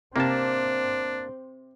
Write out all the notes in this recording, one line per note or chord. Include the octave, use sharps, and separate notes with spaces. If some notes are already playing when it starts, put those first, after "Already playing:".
C3 A#3 C4 D4 A5